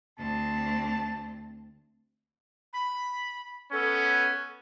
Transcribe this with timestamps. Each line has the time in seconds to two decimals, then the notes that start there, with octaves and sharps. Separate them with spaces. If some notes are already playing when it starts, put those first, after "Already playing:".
0.19 D2 C4 A5
2.73 B5
3.73 B3 C#4 A4